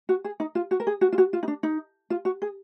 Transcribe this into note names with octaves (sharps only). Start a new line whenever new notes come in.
F#4
G#4
D#4
F4
F#4
A#4
G#4
F#4
F4
F#4
F4
D#4
D4
D#4
F4
F#4
G#4